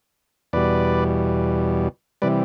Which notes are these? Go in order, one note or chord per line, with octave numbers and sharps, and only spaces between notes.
E2 B2 G3 B4 D5
C3 E3 G3 B4 D5